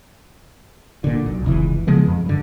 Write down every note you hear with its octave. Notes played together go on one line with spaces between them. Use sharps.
A#2 D3
B1
F1 C#2 E3
C#3 F3 G#3 B3
F2
G2 D3